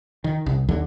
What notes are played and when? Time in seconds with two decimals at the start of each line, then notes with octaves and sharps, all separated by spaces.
0.24 D#3
0.46 C2
0.69 D#2 D3 F#3